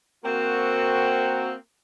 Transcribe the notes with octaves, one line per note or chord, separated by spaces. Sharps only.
A#3 C4 F#4